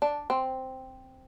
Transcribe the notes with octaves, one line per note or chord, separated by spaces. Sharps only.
D4
C4